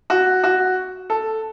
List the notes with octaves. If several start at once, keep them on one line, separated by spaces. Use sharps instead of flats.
F#4
F#4
A4